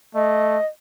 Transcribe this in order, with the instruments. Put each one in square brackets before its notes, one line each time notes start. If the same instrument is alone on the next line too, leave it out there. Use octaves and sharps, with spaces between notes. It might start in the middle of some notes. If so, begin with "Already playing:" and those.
[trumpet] A3 [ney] D#5